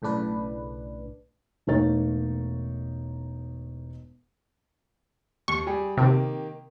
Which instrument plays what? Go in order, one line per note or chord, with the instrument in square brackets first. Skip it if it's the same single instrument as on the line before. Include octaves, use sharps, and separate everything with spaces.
[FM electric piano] B1 A2 C#3 D4 B4
[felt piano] E1 A3 A#3 D#4 C#5 A6
[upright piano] D#2 [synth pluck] C#6
[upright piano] G3 G4 G#4
[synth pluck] C3 [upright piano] D#3 A#3 G4